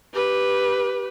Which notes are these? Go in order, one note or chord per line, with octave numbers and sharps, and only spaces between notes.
G4 B4